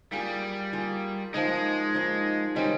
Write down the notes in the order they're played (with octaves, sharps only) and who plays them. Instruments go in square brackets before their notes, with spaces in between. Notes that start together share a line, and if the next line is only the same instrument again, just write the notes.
[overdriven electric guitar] G3 [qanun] A#3 F4 G#4
[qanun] A#3 F4 G#4
[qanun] F3 A#3 D#4 [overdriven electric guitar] G#3
[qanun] F3 A#3 D#4
[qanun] C3 D#3 G#3 C#4 [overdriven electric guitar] G3